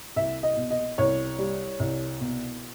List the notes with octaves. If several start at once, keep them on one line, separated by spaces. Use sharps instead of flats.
C2 E5
D#5
B2
D#5
C2 C#5
G3
C2
B2